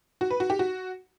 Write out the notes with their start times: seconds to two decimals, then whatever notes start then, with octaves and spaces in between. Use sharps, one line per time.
0.21 F#4
0.31 B4
0.40 F#4
0.50 G4
0.59 F#4